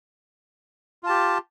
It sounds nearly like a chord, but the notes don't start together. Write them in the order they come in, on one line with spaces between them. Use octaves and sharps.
F4 A5 G4